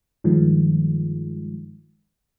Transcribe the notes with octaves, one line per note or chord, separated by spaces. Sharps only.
G2 D#3 F3 G#3